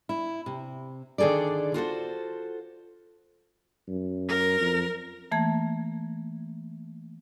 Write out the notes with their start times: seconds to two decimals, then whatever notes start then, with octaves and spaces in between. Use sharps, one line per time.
0.09 E4
0.46 C3
1.18 D3 D#3 G#4 A4 D5
1.74 F4 F#4 A4 C5
3.88 F#2
4.29 A#4
4.60 F2
5.32 E3 A3 A#3 A5 G#6